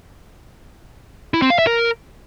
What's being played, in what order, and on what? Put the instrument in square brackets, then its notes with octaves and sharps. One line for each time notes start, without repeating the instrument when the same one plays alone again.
[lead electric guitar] E4
C4
F5
E5
A#4